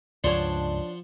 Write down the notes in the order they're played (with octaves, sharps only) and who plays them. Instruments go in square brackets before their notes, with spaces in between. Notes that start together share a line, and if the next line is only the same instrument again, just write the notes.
[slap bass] C#2 G2 [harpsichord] F3 F#5 C6 [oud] D4 C#5